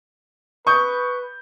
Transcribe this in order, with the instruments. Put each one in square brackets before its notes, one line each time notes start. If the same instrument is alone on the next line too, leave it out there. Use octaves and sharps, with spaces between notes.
[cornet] B4 [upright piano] C#6 D#6 G6